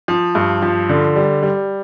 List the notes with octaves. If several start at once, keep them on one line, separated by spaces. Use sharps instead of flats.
F3
G2
F3
D3
G3
G3